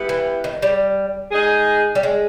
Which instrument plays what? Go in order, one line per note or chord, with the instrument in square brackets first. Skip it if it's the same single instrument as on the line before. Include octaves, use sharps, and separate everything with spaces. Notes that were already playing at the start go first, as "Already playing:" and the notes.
Already playing: [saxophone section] G3 B3 E4 G4 B4
[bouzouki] E3
D#3
G3
[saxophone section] G#3 D#4 G#4
[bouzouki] G3
G#3